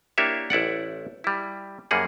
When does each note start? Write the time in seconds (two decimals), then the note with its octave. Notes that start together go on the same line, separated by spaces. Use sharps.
0.18 A#3 D4 E4 G4 C#5 E5
0.50 A1 E4 D5 F#5
1.24 G3 E4
1.91 F#2 G3 A#3 G#4 F#5